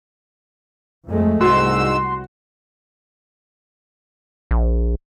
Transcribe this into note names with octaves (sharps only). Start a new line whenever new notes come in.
F2 G#3 A3
C2 G#2 F#4 C6 E6
A#1